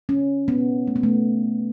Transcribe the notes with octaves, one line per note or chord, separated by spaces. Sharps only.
C#4
B3
A3
B3
A3